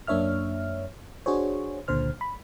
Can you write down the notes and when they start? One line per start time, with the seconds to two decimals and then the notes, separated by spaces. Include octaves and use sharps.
0.07 F#2 A#3 D4 C#5 E5 F6
1.26 D4 F#4 G#4 C5 C#5
1.88 C#2 A#2 D3 C5 F6
2.21 B5